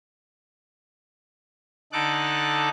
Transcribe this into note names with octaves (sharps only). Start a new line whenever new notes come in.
D3 D#4 A4 D6 F#6